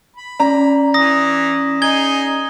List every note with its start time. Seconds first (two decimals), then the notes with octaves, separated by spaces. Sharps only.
0.16 B5
0.40 C#4 D5 A#5
0.94 E3 D#6 A#6
1.82 D#4 G#4 G#6 G7